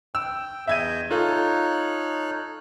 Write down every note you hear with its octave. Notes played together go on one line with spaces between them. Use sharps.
G5 E6
E2 D#5 E5 G6 G#6 D#7
D#4 F4 A4 C#5 F#6